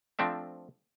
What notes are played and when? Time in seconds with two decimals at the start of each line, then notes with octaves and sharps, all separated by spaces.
0.19 F3 A3 C4 D4 E5